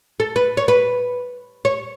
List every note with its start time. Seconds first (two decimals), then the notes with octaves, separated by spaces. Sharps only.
0.20 A4
0.36 B4
0.57 C#5
0.68 B4
1.65 C#5